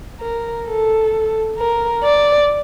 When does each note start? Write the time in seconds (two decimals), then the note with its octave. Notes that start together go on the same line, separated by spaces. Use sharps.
0.20 A#4
0.67 A4
1.58 A#4
2.04 D5